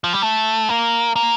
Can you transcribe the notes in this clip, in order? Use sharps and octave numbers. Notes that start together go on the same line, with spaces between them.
F3
G3
A3
A#3
A#3